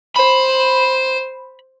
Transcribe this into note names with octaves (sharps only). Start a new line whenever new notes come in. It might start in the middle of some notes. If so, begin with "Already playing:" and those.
C5 B5